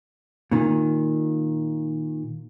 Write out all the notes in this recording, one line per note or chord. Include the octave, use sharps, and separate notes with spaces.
A#2 D#3